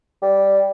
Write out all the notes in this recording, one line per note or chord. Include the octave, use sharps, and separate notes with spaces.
G3